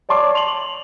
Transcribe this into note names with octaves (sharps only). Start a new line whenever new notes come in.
C#5 D5 A5 C6 D6
F7 F#7